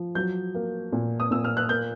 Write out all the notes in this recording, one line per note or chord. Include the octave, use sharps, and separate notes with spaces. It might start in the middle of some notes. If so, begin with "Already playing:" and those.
Already playing: F3
F#3 G6
A#3
A#2
D#6
A#2 E6
F6
F#6
A#3 G6